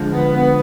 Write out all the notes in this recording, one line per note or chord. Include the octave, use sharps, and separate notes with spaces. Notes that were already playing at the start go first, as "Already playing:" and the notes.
Already playing: D3 F3 G#3
B3
B3